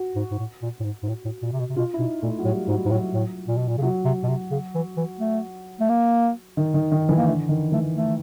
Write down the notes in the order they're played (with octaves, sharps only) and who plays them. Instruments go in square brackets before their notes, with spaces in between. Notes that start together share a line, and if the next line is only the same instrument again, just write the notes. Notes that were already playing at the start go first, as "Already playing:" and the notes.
Already playing: [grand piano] F#4
[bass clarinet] G#2
G#2
A2
A#2
A2
G#2
G#2
A2
A2
A#2
C3
B2
C3
[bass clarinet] B2 [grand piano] F4
[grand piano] E4
[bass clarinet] B2 [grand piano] D#4
[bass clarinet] A#2 [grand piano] A3
[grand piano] F#3
[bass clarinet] A2 [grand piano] G3
[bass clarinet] G#2 [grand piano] F#3
[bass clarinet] G#2
[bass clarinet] A2 [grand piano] F#3
[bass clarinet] A2
A#2
B2
A#2
C#3
[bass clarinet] C3 [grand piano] F#3
[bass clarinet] C3
B2
C3
C#3
E3
E3
A3
A3
A#3
[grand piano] D#3
D#3
D#3
E3
[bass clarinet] A#3
[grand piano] D3 [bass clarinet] A3
[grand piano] D#3
[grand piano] E3 [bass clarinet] A3
[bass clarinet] A3